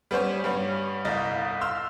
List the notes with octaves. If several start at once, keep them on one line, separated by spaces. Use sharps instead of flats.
G3 B3 C#4 C5 C#5
G2 G3 B3 C#4
G1 C2 D#5 F5 A6
F5 C6 E6 F6